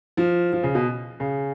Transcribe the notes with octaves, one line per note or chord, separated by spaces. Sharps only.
F3
F3
C#3
B2
C#3